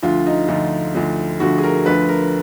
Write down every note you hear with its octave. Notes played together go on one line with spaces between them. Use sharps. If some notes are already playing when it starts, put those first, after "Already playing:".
D2 D3 F3 F4
D#4
D2 D3 F3 D#4
D2 D3 F3
D2 D3 F3 F#4
G#4
A#4
D2 D3 F3 B4
A#4